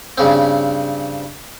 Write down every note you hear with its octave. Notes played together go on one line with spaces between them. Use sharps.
G2 C#3 C4